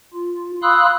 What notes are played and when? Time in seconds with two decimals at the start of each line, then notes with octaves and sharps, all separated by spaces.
0.13 F4
0.62 F5 B5 C6 D#6 E6 F#6